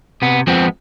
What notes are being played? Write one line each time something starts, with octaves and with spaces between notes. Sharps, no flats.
C3 B3
F3 G#3 B3 C4